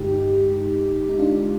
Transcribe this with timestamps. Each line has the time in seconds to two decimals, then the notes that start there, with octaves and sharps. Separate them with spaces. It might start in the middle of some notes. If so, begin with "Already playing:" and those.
Already playing: G2 D3 G#3 D#4 G4
1.09 D#4
1.19 D4 F4